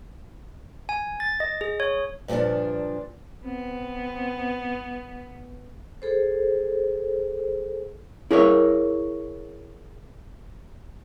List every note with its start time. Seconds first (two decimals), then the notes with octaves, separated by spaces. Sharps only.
0.89 G#5
1.20 A6
1.40 D#5
1.61 G#4
1.80 C#5
2.28 G2 A#2 D3 F3 D4
3.45 B3 C4
6.02 G#4 A4 C5
8.31 E4 G#4 A#4 C#5